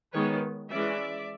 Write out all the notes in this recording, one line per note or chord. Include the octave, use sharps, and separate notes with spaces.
D#3 G#3 B3 B4 C#5
E3 G#3 C#4 D5 E5